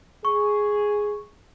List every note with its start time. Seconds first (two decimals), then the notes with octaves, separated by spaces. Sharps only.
0.25 G#4 C#6